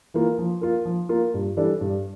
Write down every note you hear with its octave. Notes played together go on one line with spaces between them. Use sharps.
E3 A#3 F4
F3
A#3 F4 A#4
F3
A#3 F4 A#4
G2
E3 G3 D4 A4
G2